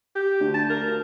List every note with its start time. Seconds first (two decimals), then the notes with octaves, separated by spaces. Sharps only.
0.15 G4
0.40 D2
0.54 A5
0.70 A#4